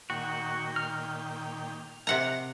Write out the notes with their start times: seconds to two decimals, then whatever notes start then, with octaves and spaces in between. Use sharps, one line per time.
0.10 A#2 D#3 F#4 G5
0.76 F6
2.07 C3 F#5 A#5